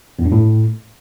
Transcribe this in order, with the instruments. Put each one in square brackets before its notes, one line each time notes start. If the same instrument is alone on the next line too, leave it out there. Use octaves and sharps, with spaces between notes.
[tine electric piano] E2
G2
A2